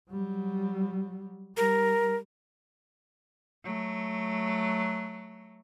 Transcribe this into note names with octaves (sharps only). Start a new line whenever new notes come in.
F#3 G3
G3 A#4
F#3 A3